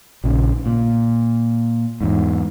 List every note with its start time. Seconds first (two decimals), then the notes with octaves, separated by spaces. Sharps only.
0.24 A#1 C#3
0.66 A#2
2.01 E2 G#2